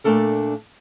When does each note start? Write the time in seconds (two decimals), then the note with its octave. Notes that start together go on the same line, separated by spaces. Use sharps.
0.04 A#2 G#3 A3 D4 A4 A#4